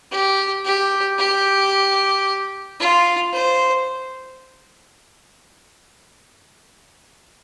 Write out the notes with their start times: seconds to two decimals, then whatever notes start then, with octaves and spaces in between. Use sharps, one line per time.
0.11 G4
0.65 G4
1.18 G4
2.80 F4
3.33 C5